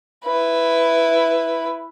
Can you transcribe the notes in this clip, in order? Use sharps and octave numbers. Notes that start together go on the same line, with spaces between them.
E4 B4